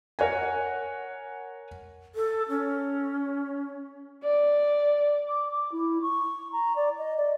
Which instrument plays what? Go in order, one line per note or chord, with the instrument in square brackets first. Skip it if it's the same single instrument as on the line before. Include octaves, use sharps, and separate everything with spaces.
[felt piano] A#4 C#5 F#5 G#5
[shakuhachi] A4
C#4
[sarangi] D5
[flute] D6
D6
E4
C#6
A#5
D5
D#5
D5